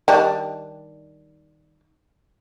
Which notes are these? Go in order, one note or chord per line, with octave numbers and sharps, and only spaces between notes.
D#3 G3 D4